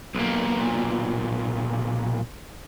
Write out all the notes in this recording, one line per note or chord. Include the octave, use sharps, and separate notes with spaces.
B1 A#2